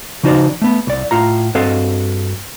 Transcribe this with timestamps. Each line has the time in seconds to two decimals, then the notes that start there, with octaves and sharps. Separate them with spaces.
0.23 C#3 F3 D#4 F#4 C5 D5
0.62 A3 B3
0.87 C2 D5
1.11 A2 F4 A#5
1.55 G2 C4 F#4 A4 D#5 F5